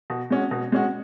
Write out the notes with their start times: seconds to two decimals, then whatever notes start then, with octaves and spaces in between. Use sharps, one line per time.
0.10 B2
0.30 G#3 C#4 F#4
0.51 B2
0.72 G#3 C#4 F#4